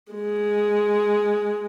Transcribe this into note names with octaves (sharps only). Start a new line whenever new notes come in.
G#3